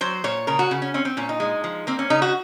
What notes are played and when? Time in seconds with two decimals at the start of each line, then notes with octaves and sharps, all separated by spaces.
0.01 F#3 C5
0.24 A#2 C#5
0.47 C#3 A#4
0.59 F#4
0.71 C#3
0.82 C#4
0.94 C4 C#4
1.05 C4
1.17 A#2 C#4
1.29 D#4
1.40 G#3
1.64 F3
1.87 A#3 C4
1.99 C#4
2.10 C#3 D#4
2.22 F#4